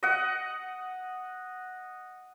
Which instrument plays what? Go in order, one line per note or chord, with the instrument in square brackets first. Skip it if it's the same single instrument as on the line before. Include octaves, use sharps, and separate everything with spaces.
[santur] D#5 F#5